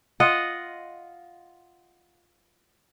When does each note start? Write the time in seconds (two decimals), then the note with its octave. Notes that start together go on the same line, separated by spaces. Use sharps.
0.20 F4 D#5 F#5